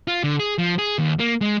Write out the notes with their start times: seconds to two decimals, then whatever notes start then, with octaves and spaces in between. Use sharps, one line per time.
0.08 F4
0.24 D3
0.40 G#4
0.58 F3
0.78 G#4
0.99 D#2
1.19 A#3
1.41 G#3